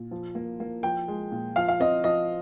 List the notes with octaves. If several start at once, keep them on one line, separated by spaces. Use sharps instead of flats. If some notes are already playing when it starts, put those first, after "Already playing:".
Already playing: A#2
F3
A#3
A#3
F3 G5
G#3
A#2
F3 F5
F5
C4 D#5
F3 D#5